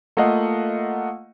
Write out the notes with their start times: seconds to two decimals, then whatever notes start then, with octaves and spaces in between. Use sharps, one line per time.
0.17 A3 A#3 F4 D#5 F5 F#5